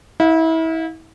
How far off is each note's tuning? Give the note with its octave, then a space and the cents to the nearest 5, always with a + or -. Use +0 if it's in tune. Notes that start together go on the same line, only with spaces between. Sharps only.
E4 -30 F5 +25